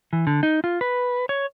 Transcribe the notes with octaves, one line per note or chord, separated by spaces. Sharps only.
E3
D3
D#4
F4
B4
C#5